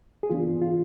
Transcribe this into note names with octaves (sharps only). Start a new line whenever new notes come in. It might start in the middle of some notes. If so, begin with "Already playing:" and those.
G#4
E3 B3 D4 F4
F4